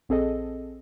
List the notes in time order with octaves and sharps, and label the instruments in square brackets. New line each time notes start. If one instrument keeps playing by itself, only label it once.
[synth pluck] A#1 C4 G#4 A4 D#5